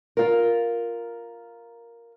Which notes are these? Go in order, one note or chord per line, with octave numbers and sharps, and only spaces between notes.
F4 A#4